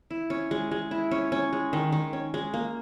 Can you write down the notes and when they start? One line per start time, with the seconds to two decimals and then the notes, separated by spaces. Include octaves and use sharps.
0.11 E4
0.30 C#4
0.51 G#3
0.71 G#3
0.91 E4
1.11 C#4
1.32 C#4
1.53 G#3
1.73 D#3
1.92 D#3
2.13 C#4
2.34 G#3
2.54 A#3